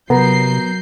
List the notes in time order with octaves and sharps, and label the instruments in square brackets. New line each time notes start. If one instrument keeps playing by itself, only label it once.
[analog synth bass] C3 [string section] F#3 G6 C7 [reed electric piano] B3 [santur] A#4